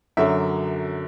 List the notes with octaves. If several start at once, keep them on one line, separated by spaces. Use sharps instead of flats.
F#2 D3 F#3 E5